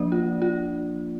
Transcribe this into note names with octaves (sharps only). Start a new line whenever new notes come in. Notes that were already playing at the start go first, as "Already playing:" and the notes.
Already playing: F3 A#3 D4 D5
F4
F4